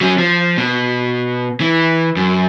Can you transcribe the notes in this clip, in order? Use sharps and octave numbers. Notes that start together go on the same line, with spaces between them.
F#3 C#4
F3
B2
E3
F#2